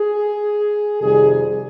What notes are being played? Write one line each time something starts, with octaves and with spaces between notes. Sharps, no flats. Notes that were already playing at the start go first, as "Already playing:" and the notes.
Already playing: G#4
F2 C3 D#3 G3 G#4